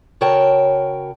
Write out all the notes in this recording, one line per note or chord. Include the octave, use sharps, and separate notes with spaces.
C#3 F#4 A#4 C#5 G5 A5